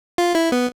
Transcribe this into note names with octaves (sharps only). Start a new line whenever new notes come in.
F4
E4
B3